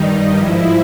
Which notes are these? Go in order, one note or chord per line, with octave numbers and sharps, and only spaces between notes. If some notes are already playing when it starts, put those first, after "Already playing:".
Already playing: G2 D#3 G3 D#4
G#2 F3 E4